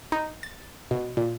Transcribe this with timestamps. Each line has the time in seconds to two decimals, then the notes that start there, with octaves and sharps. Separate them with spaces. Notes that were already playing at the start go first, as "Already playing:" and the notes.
0.12 D#4
0.43 A6
0.91 B2
1.17 A#2